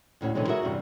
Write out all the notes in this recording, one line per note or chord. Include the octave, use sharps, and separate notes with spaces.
D2 A2 C#4 F#4
B2 D3 E3 F#3 G#3 C4
F#4 G#4 A#4 E5
E2 G2 C3 E3